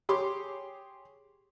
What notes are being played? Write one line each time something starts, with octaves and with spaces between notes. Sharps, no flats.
G4 G#4 C#5 C6 D6